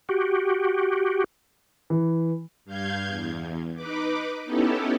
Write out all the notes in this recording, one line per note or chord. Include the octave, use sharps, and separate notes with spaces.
F#4 G4
E3
G2 F5 G6 G#6
E2
D#4 B4 D6
B3 C#4 D#4 E4 G4 A4